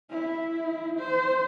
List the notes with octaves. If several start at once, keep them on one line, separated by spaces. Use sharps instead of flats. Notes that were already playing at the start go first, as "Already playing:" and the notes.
E4
C5